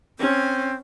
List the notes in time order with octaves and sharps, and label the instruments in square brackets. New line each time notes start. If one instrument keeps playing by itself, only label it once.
[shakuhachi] C4 [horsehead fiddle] C#4